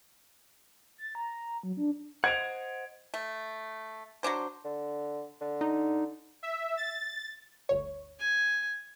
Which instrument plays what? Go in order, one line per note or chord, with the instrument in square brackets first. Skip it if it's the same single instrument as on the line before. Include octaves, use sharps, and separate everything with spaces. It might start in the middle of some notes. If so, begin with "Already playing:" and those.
[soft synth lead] A6
A#5
F#3
D4
[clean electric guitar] C5 D#5 F#5 [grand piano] G#6 D7 F7
[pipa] A3
F#3 A3 D4 C5
[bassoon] D3
D3
[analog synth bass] D#4
[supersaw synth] E5
A6
[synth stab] G1 D2 C#5
[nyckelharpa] G#5